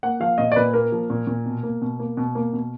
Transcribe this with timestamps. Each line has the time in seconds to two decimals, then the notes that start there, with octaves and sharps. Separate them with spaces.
0.03 A#3 F#5
0.20 F3 F5
0.38 A#2 D#5
0.52 D5
0.56 A#2 B4
0.73 A#3 A#4
0.92 F3
1.10 A#2
1.27 A#2
1.46 B2
1.63 A#3
1.82 B2
1.99 A#3
2.17 B2
2.35 A#3
2.53 B2